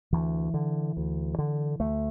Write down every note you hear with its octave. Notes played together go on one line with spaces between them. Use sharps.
D2 E3
D3
D2
D3
D2 A3